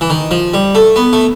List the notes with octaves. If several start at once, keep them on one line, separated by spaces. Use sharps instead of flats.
E3
D#3
F3
G3
A3
B3
A3